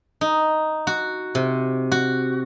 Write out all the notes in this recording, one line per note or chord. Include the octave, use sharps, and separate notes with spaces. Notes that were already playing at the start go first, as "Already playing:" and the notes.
D#4
F#4
C3
F#4